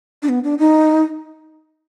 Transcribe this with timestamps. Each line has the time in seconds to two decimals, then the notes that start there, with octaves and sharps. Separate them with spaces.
0.23 D4
0.29 B3
0.44 D4
0.59 D#4